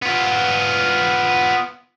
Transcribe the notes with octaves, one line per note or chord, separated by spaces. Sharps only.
B3 F4